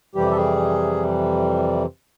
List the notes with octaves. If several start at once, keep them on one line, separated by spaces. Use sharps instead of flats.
F2 C3 E3 G3 G4
A4
G#4